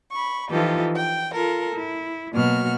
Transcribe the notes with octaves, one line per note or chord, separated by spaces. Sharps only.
B5 C#6
E3 F3 D#4 F4 G4 A4
G5
F4 A4 A#4
E4
B2 F#3 A#3 F#4 F6